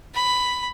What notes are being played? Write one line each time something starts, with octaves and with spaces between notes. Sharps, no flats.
B5